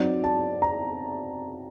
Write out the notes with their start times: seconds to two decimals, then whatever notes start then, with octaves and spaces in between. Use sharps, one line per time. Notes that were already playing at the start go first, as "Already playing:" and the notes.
Already playing: F#3 C4 D#4 D5
0.24 A5
0.62 A#5